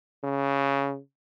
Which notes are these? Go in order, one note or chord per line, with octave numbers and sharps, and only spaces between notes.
C#3